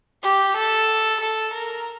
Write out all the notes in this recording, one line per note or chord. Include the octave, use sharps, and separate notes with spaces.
G4
A4
A4
A#4